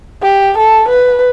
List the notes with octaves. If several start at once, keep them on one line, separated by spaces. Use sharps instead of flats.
G4
A4
B4